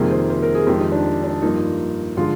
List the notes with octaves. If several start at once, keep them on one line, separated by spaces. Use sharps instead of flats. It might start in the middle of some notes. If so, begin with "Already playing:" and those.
Already playing: F2 C3 D#3 G3 A#3 G#4
C5
C5
A#4
G#4
F2 D#3 G#3 G4
D#4
D4
D4
G2 F3 A#3 D#4
D3 F3 G#3 F4